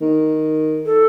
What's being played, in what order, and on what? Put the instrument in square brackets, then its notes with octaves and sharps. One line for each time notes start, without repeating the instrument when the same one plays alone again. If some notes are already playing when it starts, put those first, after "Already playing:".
[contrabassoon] D#3
[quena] A4